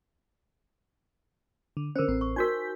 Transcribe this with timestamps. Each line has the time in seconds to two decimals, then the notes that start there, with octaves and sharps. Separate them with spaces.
1.77 D3
1.96 D3 C#4 A#4 C5
2.08 A1 C4
2.21 C#6
2.36 D#4 F#4 A#4 G#5 G6 B6